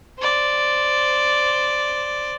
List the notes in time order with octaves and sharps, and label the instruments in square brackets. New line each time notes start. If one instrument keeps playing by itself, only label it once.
[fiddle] C5 D5